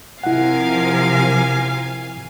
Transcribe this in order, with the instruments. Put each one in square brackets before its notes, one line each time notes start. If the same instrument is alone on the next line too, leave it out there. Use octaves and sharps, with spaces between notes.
[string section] C3 F3 A#4 [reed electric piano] E4 F#5 [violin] F5 G#5